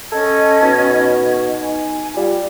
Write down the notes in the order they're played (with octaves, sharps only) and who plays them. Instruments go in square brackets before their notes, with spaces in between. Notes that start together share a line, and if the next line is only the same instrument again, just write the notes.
[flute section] C#4 D#5 G#6 [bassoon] A4
[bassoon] B2 [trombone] D#4
[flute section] G#5
[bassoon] G3 [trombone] F4